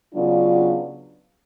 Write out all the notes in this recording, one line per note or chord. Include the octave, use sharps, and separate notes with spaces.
C#3 F#3 B3 D4 F4